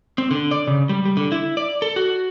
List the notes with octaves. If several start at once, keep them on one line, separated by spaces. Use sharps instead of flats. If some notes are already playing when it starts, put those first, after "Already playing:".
C4
D3
D5
C#3
G3
G3
D3
E4
D5
A4
F#4